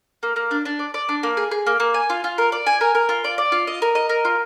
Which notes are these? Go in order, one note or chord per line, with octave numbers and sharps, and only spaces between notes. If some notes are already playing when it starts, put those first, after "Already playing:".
A#3
A#3
D4
D4
D5
D5
D4
A#3
G#4
G#4
A#3
A#3
G#5
F4
F4
A#4
D5
G#5
A#4
A#4
F4
D5
D5
F4
D#5
A#4
D#5
A#4
F4